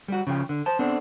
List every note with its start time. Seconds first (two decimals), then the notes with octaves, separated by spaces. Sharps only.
0.08 G3 F#4
0.27 C#3 F3 G5
0.49 D3
0.66 C5 A5
0.79 B3 C4 D4 A4